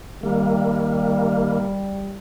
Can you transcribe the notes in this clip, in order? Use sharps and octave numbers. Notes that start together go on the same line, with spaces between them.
D#3 G3 A#3